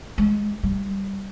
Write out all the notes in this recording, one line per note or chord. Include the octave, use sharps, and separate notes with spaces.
G#3
G3